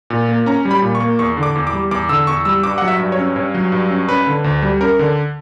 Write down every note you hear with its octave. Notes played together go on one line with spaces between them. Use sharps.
A#2
A#3
C#4 A#5
G3
B5
A#2
C#6
A#3
E2 C#6
D3
D6
E2
D6
G3
E2 D6
D3 E6
E2 C#6
G3 E6
G2 D6
F#3 F#5
E5
G2
C#5
C#4
G2 C#5
F#3
G2
C#4
C#4 B4
D3
D2
G3
C#4 A#4
D3